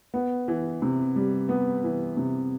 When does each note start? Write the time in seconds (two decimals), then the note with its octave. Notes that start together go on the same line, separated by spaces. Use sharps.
0.14 B3
0.48 E3
0.82 C3
1.16 G3
1.49 B3
1.84 E3
2.17 C3